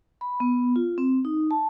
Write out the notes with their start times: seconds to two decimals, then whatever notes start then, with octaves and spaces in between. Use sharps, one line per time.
0.21 B5
0.40 B3
0.76 F4
0.98 C4
1.25 D#4
1.51 A5